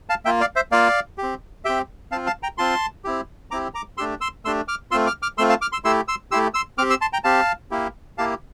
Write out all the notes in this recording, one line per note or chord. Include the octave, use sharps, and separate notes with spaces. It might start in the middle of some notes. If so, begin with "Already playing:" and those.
F5 A5
A#3 F4 E5 G5
D5 F5
C5 E5
A#3 F4 D5 F5
G4
C4
C4 G4 E5 G5
C4 F4 F5 A5
F5 A5
G5 A#5
C4 F4 A5 C6
C4 E4 G4
C4 E4 G4 A#5 D6
A#5 D6
A3 D4 G4 C6 E6
C6 E6
A3 D4 G4 C6 E6
D6 F6
A3 C4 F4 C6 E6
D6 F6
D6 F6
A3 C4 F4 C6 E6
F5 A5
D6 F6
C6 E6
A3 E4 G4 C6 E6
C6 E6
A3 E4 G4 C6 E6
C6 E6
C4 G4 D6 F6
C6 E6
A5 C6
G5 A#5
C4 G4 F5 A5
A#3 E4 G4
A#3 E4 G4 F5 A5